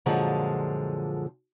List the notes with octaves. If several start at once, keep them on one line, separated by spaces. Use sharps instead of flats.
F#2 A#2 D3 F3 G#3